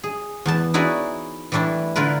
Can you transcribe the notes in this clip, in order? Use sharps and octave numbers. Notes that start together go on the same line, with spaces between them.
G#4
E2 B3 A5
D#4 E4 F#4 G#4 C#5 D5
E3 G3 A3 D4 E4
D3 E4 F4 A#4 B4